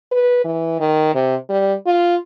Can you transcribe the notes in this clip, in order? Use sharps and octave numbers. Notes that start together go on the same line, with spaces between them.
B4
E3
D#3
C3
G3
F4